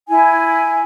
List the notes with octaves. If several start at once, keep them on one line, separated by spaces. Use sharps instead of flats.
E4 G#5